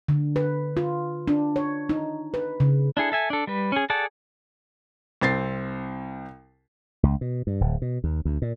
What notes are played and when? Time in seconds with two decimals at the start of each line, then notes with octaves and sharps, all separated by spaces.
0.09 D3
0.36 B4
0.77 F4
1.28 D4
1.56 C#5
1.89 D#4
2.34 B4
2.60 C#3
2.97 D4 E4 G#4 A4
3.12 A4 E5 G#5
3.30 D4 A4
3.47 G3 B4
3.72 C#4 G#4
3.90 G#4 A4 D5 F#5 A5
5.21 C2 C4 A6 C7
7.03 C#2
7.21 B2
7.47 G2
7.61 D1
7.82 B2
8.04 D#2
8.25 D2
8.42 A#2